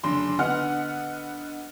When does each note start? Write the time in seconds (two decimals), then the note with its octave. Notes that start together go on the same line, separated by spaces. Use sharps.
0.04 F#1 D3 D4 C6
0.38 D3 B3 D#5 F#5 F6